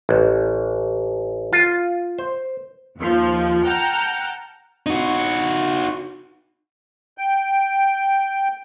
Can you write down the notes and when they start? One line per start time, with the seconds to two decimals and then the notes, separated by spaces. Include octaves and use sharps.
0.09 A1
1.53 F4
2.19 C5
2.97 D#2 F3
3.63 F#5 G5 A5 A#5 F6
4.86 D#4 F#4
7.18 G5